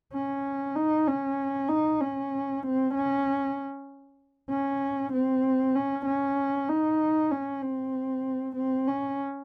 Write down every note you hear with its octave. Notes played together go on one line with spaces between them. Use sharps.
C#4
D#4
C#4
D#4
C#4
C4
C#4
C#4
C4
C#4
C#4
D#4
C#4
C4
C4
C#4